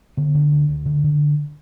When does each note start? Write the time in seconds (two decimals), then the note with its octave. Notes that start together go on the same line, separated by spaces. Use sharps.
0.17 D3 B3
0.35 D3
0.52 D2
0.69 D2
0.86 D3
1.04 D3